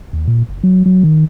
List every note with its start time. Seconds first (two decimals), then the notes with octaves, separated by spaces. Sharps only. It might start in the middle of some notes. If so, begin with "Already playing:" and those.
0.13 D#2
0.27 A#2
0.49 F#1
0.63 F#3
0.86 F#3
1.03 D#3